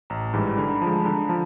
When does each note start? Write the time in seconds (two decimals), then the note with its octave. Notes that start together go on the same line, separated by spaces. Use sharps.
0.10 A1 A#5
0.33 G#2 E3 G3 B5
0.57 D3 B5
0.70 A#5
0.81 F3 G#3 A5
0.93 A5
1.05 D3 A#5
1.29 F3 A5